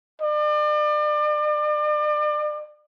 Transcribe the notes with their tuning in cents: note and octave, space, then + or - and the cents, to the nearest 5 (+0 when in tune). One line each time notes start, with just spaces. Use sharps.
D5 +40